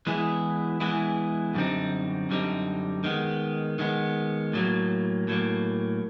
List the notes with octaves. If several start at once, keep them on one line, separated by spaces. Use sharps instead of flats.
E3 G#3 B3 E4 G#4
E3 G#3 B3 E4 G#4
F#2 D3 G3 C4 D#4
F#2 D3 G3 C4 D#4
D#3 G#3 B3
D#3 G#3 B3
A2 F#3 A#3
A2 F#3 A#3